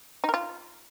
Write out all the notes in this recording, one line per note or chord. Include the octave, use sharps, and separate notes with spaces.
D#4
A#4
F4